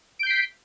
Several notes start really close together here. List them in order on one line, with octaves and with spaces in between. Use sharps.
D7 G6 C7 B6